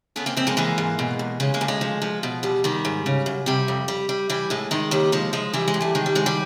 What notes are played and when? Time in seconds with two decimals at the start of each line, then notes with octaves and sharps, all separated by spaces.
0.16 C#3 A3 B3
0.26 A#3 C4
0.37 F2 A#3 C4
0.47 G#3 A#3
0.57 E3 G#3 A#3
0.78 G#2
0.99 B2
1.19 E2
1.40 C#3 G#3
1.54 G#3 A#3
1.61 D2
1.68 G#3
1.81 F3
2.02 F3
2.23 B2
2.43 E2 G3
2.64 D#3 G3
2.85 G#2
3.06 C#3
3.26 F#2
3.46 C3 G3
3.68 F2
3.88 G3
4.09 G3
4.30 E3 G3
4.50 A2 G#3
4.71 D#3 G#3
4.91 D#2 G3
5.12 F3 G#3
5.33 F3 G#3
5.54 E3 G3
5.68 G#3
5.74 G2
5.81 G3 A3
5.95 D#3 G#3
6.06 G3
6.15 F#2 G#3
6.26 G3